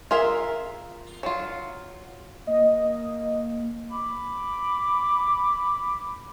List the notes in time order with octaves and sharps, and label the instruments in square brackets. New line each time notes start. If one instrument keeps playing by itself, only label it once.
[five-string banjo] F4 G#4 A#4 E5
F#3 F4
[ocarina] A#3 [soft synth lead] D#5
[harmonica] B5 D6